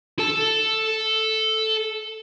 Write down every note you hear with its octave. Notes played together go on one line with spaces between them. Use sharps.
A4 A5